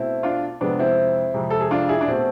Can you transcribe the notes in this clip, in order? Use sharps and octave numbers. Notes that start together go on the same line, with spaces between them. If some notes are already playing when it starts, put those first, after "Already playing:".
Already playing: B2 A3 C4 E4
D4 F4
F2 C3 G#3 B3 D4
C4 E4
F2 C3 G#3
A4
G#4
D4 F4
E4 G#4
D4
B2 A3 C4